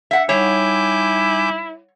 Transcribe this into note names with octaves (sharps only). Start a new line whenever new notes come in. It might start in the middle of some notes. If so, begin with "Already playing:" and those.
E5 F#5
G3 D#4 E4 C#5 G#5 D6 G6